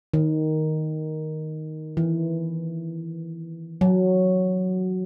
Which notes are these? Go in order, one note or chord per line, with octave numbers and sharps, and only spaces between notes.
D#3
E3
F#3